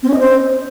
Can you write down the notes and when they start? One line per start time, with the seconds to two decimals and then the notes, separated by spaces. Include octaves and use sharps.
0.03 C4
0.08 C#4
0.14 D#5
0.19 C5